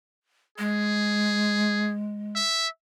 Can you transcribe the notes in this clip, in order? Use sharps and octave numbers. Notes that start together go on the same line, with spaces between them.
G#3 G#4
E5